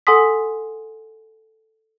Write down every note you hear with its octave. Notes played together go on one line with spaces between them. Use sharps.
A4 F#5 G#5 C6 D#6 B6